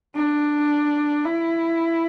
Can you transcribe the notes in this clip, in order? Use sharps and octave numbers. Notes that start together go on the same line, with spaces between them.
D4
E4